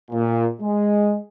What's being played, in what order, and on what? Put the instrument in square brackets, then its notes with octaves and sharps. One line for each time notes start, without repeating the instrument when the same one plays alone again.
[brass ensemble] A#2
G#3